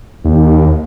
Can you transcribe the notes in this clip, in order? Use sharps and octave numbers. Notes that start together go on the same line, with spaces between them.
D#2